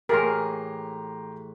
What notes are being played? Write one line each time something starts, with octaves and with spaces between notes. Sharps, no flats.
A2 E3 G4 G#4 A#4 A#5 C6